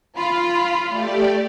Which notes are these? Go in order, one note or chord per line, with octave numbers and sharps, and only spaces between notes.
F4 B5
A3 G4 D5